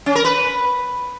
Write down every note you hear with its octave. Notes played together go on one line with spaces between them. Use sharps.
C#4
A#4
B4